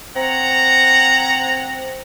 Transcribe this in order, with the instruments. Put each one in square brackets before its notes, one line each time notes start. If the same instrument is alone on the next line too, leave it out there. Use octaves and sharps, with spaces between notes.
[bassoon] C4 [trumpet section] C#5 F#5 A#5